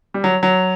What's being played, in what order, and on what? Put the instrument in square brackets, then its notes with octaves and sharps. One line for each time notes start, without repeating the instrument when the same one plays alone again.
[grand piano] G3
F#3
F#3